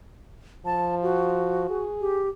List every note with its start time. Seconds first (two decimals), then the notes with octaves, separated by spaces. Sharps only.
0.65 F3 A5
1.03 F#4
1.70 G#4
2.01 G4